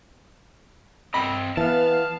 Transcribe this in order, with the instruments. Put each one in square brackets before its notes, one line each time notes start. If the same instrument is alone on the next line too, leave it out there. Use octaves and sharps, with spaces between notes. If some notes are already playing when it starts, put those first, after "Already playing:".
[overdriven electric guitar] C4 D#5 [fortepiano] B5
[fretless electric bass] E3 [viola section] B3 F5 [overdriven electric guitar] A5